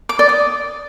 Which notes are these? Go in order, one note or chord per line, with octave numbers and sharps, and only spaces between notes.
D6
D5
D#6